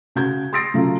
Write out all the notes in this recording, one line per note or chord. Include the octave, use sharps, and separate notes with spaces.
C#3 F#4 G6 G#6
C6 D#6 E6 A#6 C7 D7
C#3 F#3 A3 F4